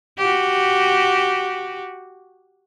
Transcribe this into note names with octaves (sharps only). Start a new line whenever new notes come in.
F#4 G4